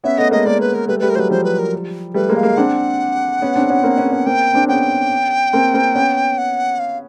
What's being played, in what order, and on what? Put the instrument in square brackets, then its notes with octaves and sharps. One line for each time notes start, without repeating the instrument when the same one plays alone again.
[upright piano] B3 C#4 [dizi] E5
[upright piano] A3 B3 [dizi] D#5
[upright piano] G#3 A#3 [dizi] D#5
[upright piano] G#3 A#3 [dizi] D5
[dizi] B4
A#4
[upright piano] G3 A3 [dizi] B4
[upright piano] G3 A3 [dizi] B4
[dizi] A#4
[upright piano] F#3 G#3 [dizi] B4 C5
[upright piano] F3 G3 [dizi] C5
[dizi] B4
A#4
[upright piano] G3 A3 [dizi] B4
[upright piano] G#3 A#3
[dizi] F5
[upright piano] G#3 A#3
[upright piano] C4 D4 [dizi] F#5
[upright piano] B3 C#4
C4 D4
B3 C#4
A#3 C4
B3 C#4
B3 C#4
[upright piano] A#3 C4 [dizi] G5
[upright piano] C4 D4
[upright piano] B3 C#4 [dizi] G5
[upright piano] A#3 C4
A#3 C4
B3 C#4
[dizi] F#5
F5